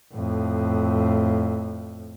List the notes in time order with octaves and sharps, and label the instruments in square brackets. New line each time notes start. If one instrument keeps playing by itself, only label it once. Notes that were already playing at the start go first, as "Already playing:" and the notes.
[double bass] F2 A2